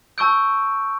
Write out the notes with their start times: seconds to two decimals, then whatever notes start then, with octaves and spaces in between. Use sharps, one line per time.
0.18 A5 C#6 E6 G6 D7